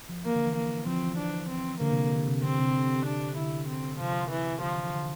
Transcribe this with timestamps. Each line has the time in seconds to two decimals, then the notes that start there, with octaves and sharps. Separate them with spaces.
0.09 F3
0.25 E3 A#3
0.35 D3
0.47 E3
0.56 A#3
0.87 F3 C4
1.03 E3
1.18 D4
1.50 C4
1.81 D3 A#3
1.91 C3
2.12 D3
2.28 C3
2.43 D3 C4
2.54 D3
2.59 C3
3.06 D4
3.37 D3 E4
3.69 C4
3.99 C3 F3
4.32 E3
4.62 D3 F3
4.78 E3
4.93 D3